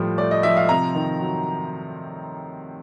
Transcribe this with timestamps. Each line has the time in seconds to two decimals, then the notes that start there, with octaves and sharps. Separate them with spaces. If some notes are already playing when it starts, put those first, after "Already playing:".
Already playing: A2 F3 G3
0.18 A3 D5
0.31 D#5
0.43 F3 E5
0.57 F5
0.69 C3 A#5
0.95 D#3
1.20 F#3